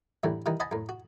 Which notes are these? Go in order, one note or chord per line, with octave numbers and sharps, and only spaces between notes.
F#2 A2 D3 E3 G3
D#3 E3 G3 D#4
D#5 F#5 G#5 A5 B5
F#2 A2
F#4